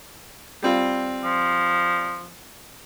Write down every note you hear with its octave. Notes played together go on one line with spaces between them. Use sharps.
G3 C4 F4
F3